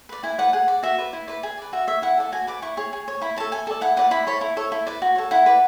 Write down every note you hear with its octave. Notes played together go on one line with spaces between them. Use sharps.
B4 D5
E4 G#5
B4 D5 F#5
G#4 F#5
D5
F#4 E5
B4 D5
E4
B4 D5
G#4
B4 D5
F#4 E5
C#5 E5
E4 F#5
A4 D5
F#4 G#5
B4 D5 D6
E4 C#6
G#4 C#5
G#4
C#5
E4 B5
A4 C#5 A5
E4 G#5
A4 D5
E4 F#5
B4 D5 F#5
E4 B5
A4 C#5 B5
E4
A4 C#5
E4
B4 D5
F#4
A4 C#5
E4 F#5
B4 D5